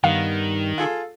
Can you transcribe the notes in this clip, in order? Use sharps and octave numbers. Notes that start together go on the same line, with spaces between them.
G2 D#3 B3 F5
F4 G#4 A4